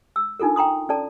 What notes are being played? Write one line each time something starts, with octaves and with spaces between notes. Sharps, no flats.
E6
D4 D#4 F4 A4 A#4
G5 A#5 C6 D#6
C#4 A4 D5 A5